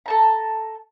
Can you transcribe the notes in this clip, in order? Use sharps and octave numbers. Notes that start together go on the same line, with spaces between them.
A4 A5 A#5